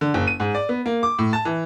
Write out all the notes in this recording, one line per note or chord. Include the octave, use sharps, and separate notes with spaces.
D3
F#1
D#7
G#2
D5
B3
A#3
D6
A2
A5
E3